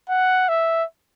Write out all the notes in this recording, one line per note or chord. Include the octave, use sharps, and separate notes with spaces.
F#5
E5